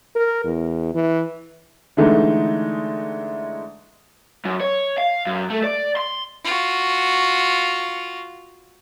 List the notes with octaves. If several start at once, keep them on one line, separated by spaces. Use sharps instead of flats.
A#4
E2
E3
D3 E3 G#3 A3 D#4
F#2
C#5
F5
F#2
A3
D5
C6
F4 F#4